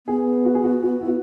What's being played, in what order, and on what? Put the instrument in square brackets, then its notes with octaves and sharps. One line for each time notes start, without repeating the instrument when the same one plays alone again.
[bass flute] B3 [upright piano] G#4
[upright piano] F#4
G#4
F#4
F#4
E4
F#4